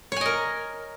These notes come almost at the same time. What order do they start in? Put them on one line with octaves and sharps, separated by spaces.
C#5 G#5 D#5 A#4